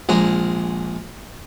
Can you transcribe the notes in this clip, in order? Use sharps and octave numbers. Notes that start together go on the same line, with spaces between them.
A#1 G#3 A#5